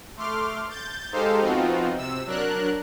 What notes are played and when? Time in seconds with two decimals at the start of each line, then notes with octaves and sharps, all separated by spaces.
0.17 A3 C6 D6 F6
0.69 G6 A6
1.12 G#3 D#4 G4 A4 C5 F5
1.41 F3 B3 C4 D#4 F4 F#4
1.97 C3 E6
2.26 F#3 D4 A#4 F#6